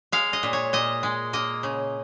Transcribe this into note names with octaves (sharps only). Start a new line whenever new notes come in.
G#3 F5
D#5
A#2
C#5
A#2 D#5
G#3
A#3 D#5
C#3